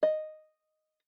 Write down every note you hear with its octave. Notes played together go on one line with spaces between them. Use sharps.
D#5